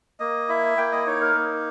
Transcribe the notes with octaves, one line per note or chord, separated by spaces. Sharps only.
A#3 D#5
E4 E5
A#3 G5
D#5
D#4 C#5
A#4
A#3